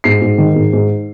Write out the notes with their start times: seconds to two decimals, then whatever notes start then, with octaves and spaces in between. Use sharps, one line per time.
0.04 G#2 C7
0.22 G#2
0.38 D#3
0.56 G#2
0.73 G#2